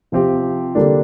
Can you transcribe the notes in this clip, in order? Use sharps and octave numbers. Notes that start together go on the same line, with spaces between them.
C3 F3 C4 G4
D3 G3 A#3 D4